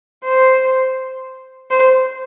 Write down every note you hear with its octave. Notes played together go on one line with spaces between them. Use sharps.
C5
C5